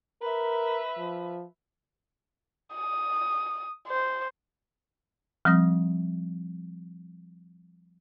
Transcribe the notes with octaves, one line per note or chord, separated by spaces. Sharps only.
A#4 B4 E5
F3
D#6
C5
F3 G3 C4 D#6 A#6